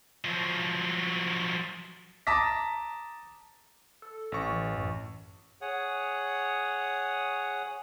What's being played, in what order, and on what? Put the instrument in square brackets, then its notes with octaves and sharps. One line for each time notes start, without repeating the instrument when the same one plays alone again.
[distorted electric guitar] F3 F#3
[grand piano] A5 A#5 D6 D#6 A#6 B6
[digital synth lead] A4
[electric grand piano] A1 C#6
[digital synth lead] E3
F#2
[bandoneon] G#4 C#5 F#5 D#6